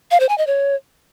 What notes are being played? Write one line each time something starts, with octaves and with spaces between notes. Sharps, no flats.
F5
C5
G#5
D#5
C#5